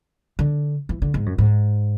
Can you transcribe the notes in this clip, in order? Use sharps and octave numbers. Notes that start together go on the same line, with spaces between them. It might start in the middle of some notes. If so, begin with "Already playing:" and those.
D3
E3
D3
G#2
F#2
G#2